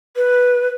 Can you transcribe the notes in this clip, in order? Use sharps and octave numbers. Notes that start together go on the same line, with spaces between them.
B4